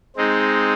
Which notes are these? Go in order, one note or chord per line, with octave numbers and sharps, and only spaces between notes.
G#3 C4 D#4